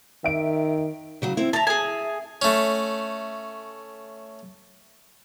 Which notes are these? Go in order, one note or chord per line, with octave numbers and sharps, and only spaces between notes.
D#3 E5 D7
C#3 F#3 F#4
C4 E4
E5 A5 A#5
G#4 G#5
A3 C#4